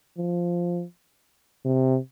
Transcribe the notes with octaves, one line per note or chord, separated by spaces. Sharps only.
F3
C3